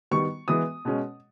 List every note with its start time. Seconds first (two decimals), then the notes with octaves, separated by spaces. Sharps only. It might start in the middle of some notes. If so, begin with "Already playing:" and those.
0.11 D#3 G3 B3 C#6
0.48 E3 G#3 B3 D#6
0.85 B2 G#3 C#4